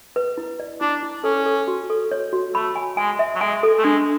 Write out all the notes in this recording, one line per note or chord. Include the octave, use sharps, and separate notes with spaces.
B4
E4
D5
D4 E4
E4
C#4 A4
A4
F#4
A4
C#5
F#4
A3 B5
G#5
G#3 G#5
E5
F#3
G#3 G#5
A4
A3
G#3 D4